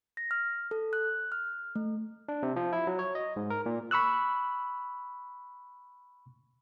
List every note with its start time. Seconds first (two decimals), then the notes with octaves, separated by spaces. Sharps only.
0.17 A#6
0.31 F6
0.71 A4
0.93 F#6
1.32 F6
1.76 A3
2.28 D4
2.43 C3
2.56 F3
2.73 E4
2.87 F#3
2.99 C#5
3.15 D#5
3.36 G#2
3.50 A#4
3.66 A#2
3.91 B5 C#6 E6 F#6